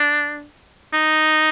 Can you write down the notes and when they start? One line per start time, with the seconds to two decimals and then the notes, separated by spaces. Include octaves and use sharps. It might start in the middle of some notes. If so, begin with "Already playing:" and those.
Already playing: D4
0.93 D#4